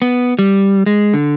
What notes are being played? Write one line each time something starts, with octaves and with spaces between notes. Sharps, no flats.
B3
G3
G#3
D3